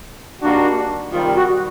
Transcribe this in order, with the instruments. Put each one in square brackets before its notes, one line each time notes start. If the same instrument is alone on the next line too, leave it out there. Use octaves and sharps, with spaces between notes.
[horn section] D#3 G3 A#3 D4 F#4
[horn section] C3 D#3 G3 [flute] F4
[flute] F#4